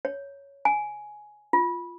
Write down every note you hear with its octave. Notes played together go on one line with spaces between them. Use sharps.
C#5
G#5
F4